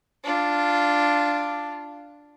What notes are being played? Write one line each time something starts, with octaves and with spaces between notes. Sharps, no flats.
D4 F4